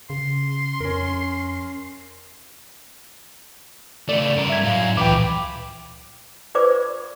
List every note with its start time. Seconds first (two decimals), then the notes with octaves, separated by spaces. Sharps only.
0.10 C#3 C6
0.80 F2 C#4 A#4
4.09 C#3 A3 D5
4.36 G2 A#4
4.50 E5 G#6
4.64 F#2 A2 F5
4.97 C#2 A#2 E3 F3 B4 G5 D6
6.55 F4 B4 C5 D5 C#6 D6